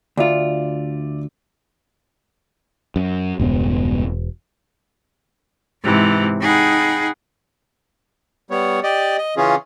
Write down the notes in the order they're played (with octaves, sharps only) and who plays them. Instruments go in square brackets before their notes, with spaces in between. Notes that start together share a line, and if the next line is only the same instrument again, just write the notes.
[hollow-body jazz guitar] D2 F4 [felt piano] D5 E5
[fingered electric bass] F#2
[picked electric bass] E1 [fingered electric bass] C#2 G2 B3
[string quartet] G#2 C3 E3
D#4 G#4 F#5 G5 B5
[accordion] G3 B3 C#5
G4 D5 D#5
D#5
C#3 E3 C#4 F4 G#4